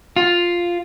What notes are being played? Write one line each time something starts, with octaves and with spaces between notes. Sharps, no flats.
F4